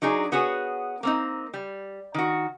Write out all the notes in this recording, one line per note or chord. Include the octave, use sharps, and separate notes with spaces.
F#3 D4 D#4 G#4
B3 F#4 G#4 C#5
A#3 C4 D#4
G3
D#3 F#4